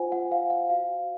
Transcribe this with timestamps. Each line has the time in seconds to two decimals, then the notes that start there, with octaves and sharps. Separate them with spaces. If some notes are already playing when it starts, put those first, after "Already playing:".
Already playing: F4 C5 F#5 G#5
0.12 F#5
0.31 C5 F5
0.50 F#5
0.70 F#4 F5